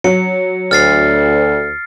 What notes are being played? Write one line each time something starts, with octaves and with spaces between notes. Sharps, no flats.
F#3 C#7
D2 F6 A6 C7